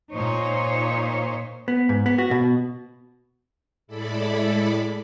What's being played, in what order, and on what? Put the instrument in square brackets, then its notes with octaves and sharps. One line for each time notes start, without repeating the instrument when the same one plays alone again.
[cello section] A#2 D#4 C5 C#5
[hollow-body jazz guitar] B3
G#2
B3
F#4
B2
[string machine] A2 G#3 E4 A4 D5 B5